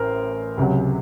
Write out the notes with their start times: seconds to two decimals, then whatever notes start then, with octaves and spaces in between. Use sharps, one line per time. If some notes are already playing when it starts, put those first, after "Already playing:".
Already playing: A1 A2 A#4 C5
0.57 C#2 C3 F#3